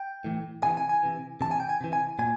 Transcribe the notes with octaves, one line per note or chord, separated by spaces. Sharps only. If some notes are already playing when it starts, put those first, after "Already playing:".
Already playing: G5
A2 E3
C3 E3 G#5
G#5
G#5
C3 E3
C3 E3 A5
G#5
G5
G#5
C3 E3
G#5
A#2 G#5